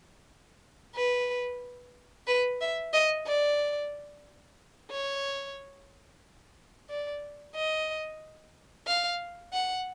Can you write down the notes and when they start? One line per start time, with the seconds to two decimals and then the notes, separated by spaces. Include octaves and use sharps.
0.95 B4
2.27 B4
2.60 E5
2.93 D#5
3.26 D5
4.91 C#5
6.90 D5
7.55 D#5
8.87 F5
9.53 F#5